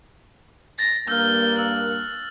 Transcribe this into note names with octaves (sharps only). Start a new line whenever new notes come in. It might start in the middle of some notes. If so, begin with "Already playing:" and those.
A6 A#6
G2 A#3 E6 F6 G6
E6 F#6